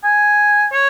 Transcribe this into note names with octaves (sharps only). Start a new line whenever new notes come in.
G#5
C#5